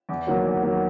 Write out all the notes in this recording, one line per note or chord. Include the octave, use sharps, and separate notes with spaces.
E2
D#3 F#3 A#3
E2
D#3 F#3 A#3